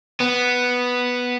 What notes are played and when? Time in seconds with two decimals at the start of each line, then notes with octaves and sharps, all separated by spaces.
0.21 B3